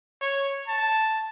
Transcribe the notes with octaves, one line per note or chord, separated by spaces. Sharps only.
C#5
A5